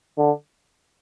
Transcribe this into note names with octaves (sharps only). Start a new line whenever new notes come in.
D3